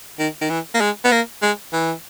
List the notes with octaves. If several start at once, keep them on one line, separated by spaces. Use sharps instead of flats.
D#3
D#3
E3
A#3
G#3
B3
A#3
G#3
E3